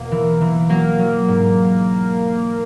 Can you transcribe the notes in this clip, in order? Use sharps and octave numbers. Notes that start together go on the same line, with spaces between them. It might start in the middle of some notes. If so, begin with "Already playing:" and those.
Already playing: E2 B2 A#3 A#4
E3
E3
F#3 A#3
F#3
G#2